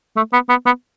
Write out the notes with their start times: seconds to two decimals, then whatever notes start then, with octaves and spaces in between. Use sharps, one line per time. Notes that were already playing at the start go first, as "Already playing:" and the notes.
0.16 A3
0.33 B3
0.49 B3
0.66 B3